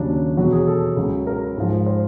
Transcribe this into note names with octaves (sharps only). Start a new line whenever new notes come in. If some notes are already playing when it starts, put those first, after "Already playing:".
Already playing: D#2 C#3 F#3 D4
E2 B2 F#3 F#4
G#4
A4
C#2 C#3 F#3
A#4
G#2 F3
C5